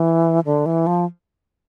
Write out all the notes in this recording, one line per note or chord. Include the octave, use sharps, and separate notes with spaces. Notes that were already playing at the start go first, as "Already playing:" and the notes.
Already playing: E3
D3
E3
F3